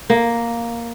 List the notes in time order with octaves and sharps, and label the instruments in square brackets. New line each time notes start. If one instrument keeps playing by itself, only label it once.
[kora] A#3